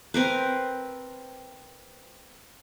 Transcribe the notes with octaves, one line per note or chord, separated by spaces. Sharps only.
C4 A#4 B4